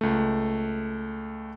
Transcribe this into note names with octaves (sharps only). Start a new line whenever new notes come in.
C#2 A3